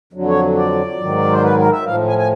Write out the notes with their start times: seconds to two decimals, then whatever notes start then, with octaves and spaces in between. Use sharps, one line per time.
0.13 F2 D3 F#3
0.28 C#5
0.57 D5
1.00 G#2 D#3 F#3
1.31 C5
1.43 B4
1.58 A#4
1.72 E5
1.86 A2 F3 F5
2.08 G#5
2.18 G#5